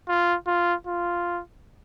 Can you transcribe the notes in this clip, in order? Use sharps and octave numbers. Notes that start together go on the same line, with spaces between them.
F4
F4
F4